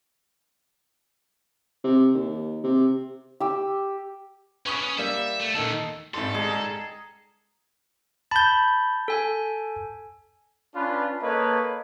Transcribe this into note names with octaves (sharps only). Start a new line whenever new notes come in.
C3
D#2
C3
G4 E6
C#4 D4 B4 C#6 D#6
C#4
G3 A#3 E5
A3
D#2 A#2 D#3 D#4 A4
G#1 G#2 G3 A4 C6
G#3 G#4 A#5
A5 B5 G6
A4 G#5
C#4 D4 F4 B4
A#3 A4 B4 C#5 D#5